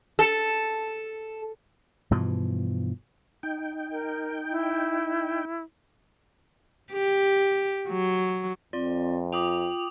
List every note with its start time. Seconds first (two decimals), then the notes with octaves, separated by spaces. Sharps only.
0.19 A4
2.11 G2 B2 E3 F3
3.43 D#4 G5
3.92 A#4
4.51 E4
6.93 G4
7.89 F#3
8.73 F2 C4 F4 D5
9.33 F4 G5 D6 D#6 F7